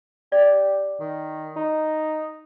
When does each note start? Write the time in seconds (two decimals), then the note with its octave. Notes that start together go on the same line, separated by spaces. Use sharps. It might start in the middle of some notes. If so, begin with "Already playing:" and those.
0.32 G4 D5
1.00 D#3
1.56 D#4